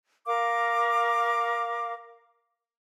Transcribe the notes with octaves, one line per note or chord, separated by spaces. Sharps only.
A#4 F5 D6